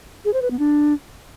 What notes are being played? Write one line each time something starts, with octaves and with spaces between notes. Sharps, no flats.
G#4
C5
B4
B3
D4